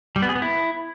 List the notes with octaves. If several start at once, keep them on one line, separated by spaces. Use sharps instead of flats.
G3
B3
G#4
B3
E4